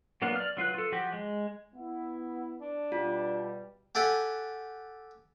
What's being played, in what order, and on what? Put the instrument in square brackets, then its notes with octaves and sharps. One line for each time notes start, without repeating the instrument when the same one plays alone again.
[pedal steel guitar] F#3 A#3 B3 D4 F4
D5 F6
F#3 F4 B4 F#6
F4 A4
F3 F#4 G4
G#3
[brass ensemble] B3 E4
[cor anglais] D4
[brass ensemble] B2 G3 [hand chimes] F4
[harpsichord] G4 A4 E5 F#5 G#5